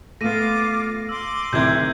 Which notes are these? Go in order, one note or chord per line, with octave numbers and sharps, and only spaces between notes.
A3 B3 F4 D6 A#6 D#7
C6 D6 E6
D1 C3 D#3 E4 G6 G#6